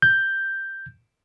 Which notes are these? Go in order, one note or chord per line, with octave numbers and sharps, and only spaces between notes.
G6